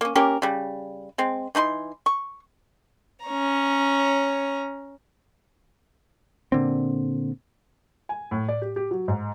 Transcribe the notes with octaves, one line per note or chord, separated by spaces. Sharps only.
A#3 C#4
A#3 C#4 G4 A#4
C#3 G3
G#3 C4
E3 D#4 B5 C6
C#6
C#4 C#5 A#5
A#2 D3 C4
G#5
A2
D5
G4
G4
F#3
G#2